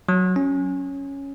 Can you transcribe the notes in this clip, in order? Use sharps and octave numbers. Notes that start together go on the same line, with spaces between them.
F#3
C#4